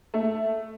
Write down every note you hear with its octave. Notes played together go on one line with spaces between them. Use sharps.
A3